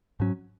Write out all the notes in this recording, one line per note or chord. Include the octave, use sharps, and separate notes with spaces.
G#2 F#3 C#4